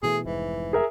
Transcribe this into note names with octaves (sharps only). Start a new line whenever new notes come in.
B2 E3 A3 G#4
F1 G#2 E3
G#4 A#4 E5